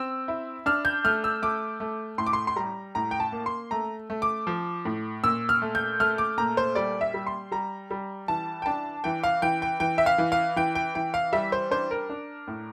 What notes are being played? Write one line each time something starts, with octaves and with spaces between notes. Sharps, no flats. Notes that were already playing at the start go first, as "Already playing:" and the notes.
Already playing: C4 E6
E4
D4 F6
G6
A3 F6
E6
A3 D6
A3
A2 C6
D6
C6
C6
G3 A#5
A2 A#5
G5
A5
A#3
C6
A3 A#5
A3
D6
F3
A2
A#2 E6
F6
A3
G6
A3 F6
D6
A#2 A#5
C5
G3 D5
E5
G3
C6
G3 A#5
G3
E3 A5
G5
D4 A5
E3 G5
F5
E3 G5
G5
E3 G5
E5
F5
E3
F5
E3 G5
G5
E3 G5
F5
G3 E5
C5
D4 C5
A#4
D4
A2